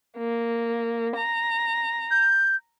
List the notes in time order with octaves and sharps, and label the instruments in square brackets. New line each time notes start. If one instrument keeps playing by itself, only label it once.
[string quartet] A#3
A#5
[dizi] G6